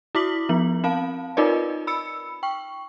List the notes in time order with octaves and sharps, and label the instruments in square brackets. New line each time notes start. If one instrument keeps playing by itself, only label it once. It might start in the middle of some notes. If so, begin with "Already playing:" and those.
[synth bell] E4 F#4 D6 B6 F#7
F3 B3 F#7
C4 F5 A5
D#4 F4 A#4 B4 D5 D#5
B5 E6 C#7
G5 C#6